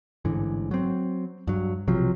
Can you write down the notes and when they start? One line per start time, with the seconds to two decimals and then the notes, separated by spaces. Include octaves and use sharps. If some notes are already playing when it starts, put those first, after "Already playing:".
0.25 A1 G#2 D3 E3
0.71 F#3 C4
1.48 G2 F#3
1.87 B1 C3 F3 F#3